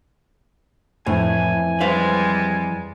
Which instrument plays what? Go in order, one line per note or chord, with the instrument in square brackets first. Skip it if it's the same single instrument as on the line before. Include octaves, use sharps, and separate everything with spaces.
[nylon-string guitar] F2 E3 E4 [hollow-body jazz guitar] A2 [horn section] G#5
[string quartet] G3 G#3 [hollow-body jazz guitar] B4 C5 F5